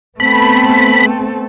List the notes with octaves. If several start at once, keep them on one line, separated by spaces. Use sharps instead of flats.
A3 B3 C4 A4 B5